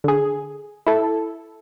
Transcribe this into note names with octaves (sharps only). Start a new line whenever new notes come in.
D3 G#4
E4 A4